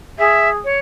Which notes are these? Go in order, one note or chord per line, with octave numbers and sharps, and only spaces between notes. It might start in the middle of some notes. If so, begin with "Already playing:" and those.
G#4 E5
C#5